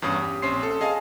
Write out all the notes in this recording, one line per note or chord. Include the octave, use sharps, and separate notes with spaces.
E2 G2 C#4 D#6
G4
A#1 C4 C#4 C6 C7
A4
G#4 D#5 F5 G#5 A5